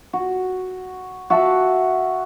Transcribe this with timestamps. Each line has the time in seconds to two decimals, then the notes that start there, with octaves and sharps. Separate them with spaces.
0.13 F#4
1.30 F#4 E5 F5 A5